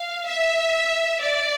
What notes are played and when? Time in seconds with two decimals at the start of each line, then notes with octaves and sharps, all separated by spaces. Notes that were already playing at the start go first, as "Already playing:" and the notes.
Already playing: F5
0.25 E5
1.20 D5